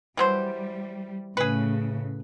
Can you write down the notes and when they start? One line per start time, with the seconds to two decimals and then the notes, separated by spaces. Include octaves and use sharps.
0.17 E3 F#3 G3 C5
1.37 A2 C#3 G#4 B4